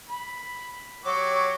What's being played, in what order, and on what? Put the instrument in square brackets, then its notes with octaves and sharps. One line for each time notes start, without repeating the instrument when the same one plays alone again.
[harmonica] B5
[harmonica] F#3 G4 D6 [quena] C#5